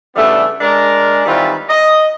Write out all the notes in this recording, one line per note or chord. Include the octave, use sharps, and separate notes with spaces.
C#3 E3 G3 A3 B3 D4
G#3 D4 A#4
D#3 E3 G3 C4 F4 B4
D#5